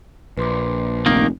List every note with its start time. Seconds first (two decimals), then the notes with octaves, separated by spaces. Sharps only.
0.37 A#1 B4 C6 D6
1.06 F1 D#3 A#3